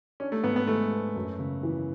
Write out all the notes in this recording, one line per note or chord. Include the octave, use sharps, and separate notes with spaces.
C#4 D4
A3
G#2 B3
B3
G#3 A3
B3
F#2
C#3
E3